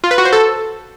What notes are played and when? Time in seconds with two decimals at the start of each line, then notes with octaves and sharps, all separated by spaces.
0.04 F4
0.11 B4
0.18 F#4
0.25 C5
0.32 A4